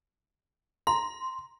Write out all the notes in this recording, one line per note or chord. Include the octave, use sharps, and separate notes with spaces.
A#5 C6